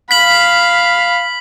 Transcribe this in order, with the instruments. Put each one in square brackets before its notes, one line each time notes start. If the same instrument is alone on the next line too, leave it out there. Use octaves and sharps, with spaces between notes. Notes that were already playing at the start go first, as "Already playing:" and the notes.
[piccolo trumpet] F5 [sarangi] B5 [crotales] B6 F#7